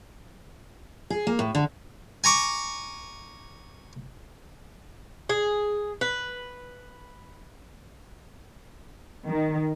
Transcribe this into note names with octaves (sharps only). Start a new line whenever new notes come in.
G#4
A#3
A2
D3
G#5 A#5 C#6 D6
G#4
B4
D#3